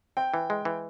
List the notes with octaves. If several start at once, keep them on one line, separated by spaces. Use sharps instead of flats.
C4 G5
E3
G#3
E3